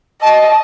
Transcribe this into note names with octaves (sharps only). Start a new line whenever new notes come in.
D#5 A5